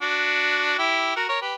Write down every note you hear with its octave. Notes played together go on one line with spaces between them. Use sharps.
D4 F#4
E4 G4
F#4 A#4
A#4 C#5
G4 B4